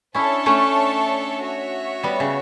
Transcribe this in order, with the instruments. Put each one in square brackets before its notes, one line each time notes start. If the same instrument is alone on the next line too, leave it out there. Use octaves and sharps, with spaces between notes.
[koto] C#4 E4 [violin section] D4 A4 C#5 E5 A5
[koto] A3 C#4
[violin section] F#4 C#5 E5
[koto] G3 B3
C#3